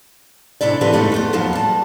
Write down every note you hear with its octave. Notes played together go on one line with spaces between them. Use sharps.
C3 C#4 D4 E4 D5
D3 E3 C4 C#4 G4 B4
F#2 A3 A#3 D#4 A4
E2 B3 C5
D#2 F3 F#3 A#3 B3 F#4
G3 A5